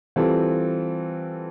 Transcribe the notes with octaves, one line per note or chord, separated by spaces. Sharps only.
E3 G3 C4 F4 A4